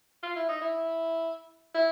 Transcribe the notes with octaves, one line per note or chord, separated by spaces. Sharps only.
F4
E4
D#4
E4
E4